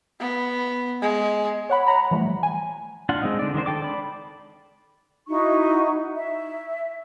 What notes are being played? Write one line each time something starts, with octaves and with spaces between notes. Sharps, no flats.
B3
G#3
C#5 F#5 B5
F#5 A#5 B5
E3 F3 G3 A3
G#5
D4 F4 F#5
G#3 C4 D#4
D3 D5
D#3 G#3 D4 C5
A4 G5 D6
D5 B5
D#4 E4 F#4 C#6
E5